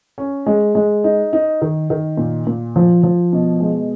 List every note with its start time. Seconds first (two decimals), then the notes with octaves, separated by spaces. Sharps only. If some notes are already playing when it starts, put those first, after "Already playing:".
0.18 C#4
0.46 G#3
0.75 G#3
1.04 D#4
1.33 D#4
1.61 D#3
1.90 D#3
2.17 A#2
2.47 A#2
2.76 F3
3.03 F3
3.33 B2
3.60 G#3